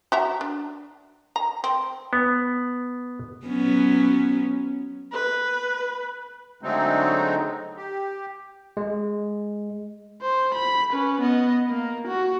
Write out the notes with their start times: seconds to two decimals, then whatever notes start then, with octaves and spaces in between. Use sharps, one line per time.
0.12 F#4 E5 A#5
0.41 D4
1.36 A#5
1.64 C4
2.13 B3
3.46 F#3 B3 C#4
5.13 B4
6.63 D3 F#3 G#3 A3 C4 D#4
7.77 G4
8.77 G#3
10.21 C5
10.54 B5
10.92 C#4 B4
11.21 B3 D#5
11.70 A#3
12.08 F#4